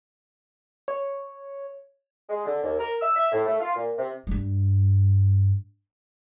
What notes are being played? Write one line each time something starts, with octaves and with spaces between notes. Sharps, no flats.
C#5
G#3
D3
D#2
A#4
E6
E5
A2
A3
F4
A#2
C3
G2 G3